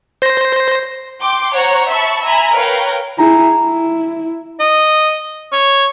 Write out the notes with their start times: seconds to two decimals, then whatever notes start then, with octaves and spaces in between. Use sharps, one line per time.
0.22 C5 A#6
1.20 G5 C6 D6
1.54 C5 C#5 F#5 A#5
1.91 E5 A5 B5 C#6
2.23 E5 G#5 A#5 B5
2.56 A#4 B4 C#5 F5 G5
3.18 E4 G#4 A#5
3.55 E4
4.60 D#5
5.52 C#5